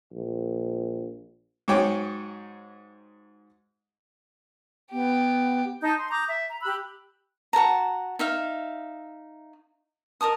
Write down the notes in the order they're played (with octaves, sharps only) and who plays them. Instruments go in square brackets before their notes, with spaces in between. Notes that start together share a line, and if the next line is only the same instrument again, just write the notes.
[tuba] A#1
[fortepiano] G#2 F#3 G#3 C#5 G5 D6
[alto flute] B3 [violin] G4
[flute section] D#4 A5 D#6 G6
C6
A#5 D6 D#6 G6
E5
A#5
G4 B5 E6 F#6
[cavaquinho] F#4 A#4 A5 A#5
D#4 E5 F5
A#4 D#5 A5 D#6